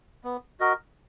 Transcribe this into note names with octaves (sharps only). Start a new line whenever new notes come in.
B3
F#4 A#4 D#5